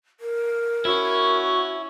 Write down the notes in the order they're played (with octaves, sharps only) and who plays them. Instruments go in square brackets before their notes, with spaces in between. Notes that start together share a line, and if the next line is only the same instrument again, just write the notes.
[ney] A#4
[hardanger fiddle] C#4 [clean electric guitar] E4 [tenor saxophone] F#4